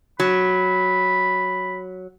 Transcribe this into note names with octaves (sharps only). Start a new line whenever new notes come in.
F#3 B5